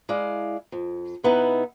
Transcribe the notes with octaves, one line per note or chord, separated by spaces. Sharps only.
G#3 E4 D5 F5
F2
C3 B3 D#4 E4 B4